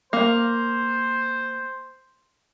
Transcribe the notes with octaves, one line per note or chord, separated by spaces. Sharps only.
A#3 C5